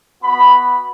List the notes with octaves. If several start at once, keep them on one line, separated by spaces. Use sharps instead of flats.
B3 F#4 B5